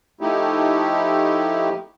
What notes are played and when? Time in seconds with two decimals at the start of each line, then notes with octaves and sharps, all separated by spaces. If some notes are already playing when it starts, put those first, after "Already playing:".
0.21 F3 A3 D#4 E4 G4